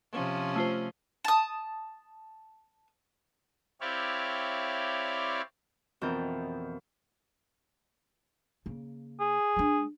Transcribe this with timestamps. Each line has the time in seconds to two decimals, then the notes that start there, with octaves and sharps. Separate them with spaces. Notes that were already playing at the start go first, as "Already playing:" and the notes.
0.12 C3 F3 C#4
0.56 A3 F4 C5
1.25 A5 D#6
3.81 C4 E4 G4 C#5 D5 F5
6.01 F2 B2 E3 F4 A#4 G6
8.66 C#3 A#3
9.20 G#4
9.56 G#3 D4